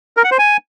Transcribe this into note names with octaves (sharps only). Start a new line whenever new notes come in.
A#4
F#5
C5
G#5